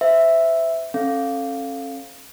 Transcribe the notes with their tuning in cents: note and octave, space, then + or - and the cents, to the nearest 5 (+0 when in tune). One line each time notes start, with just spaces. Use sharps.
C5 -30 E5 +0
C#4 -40 A4 +0 F5 +0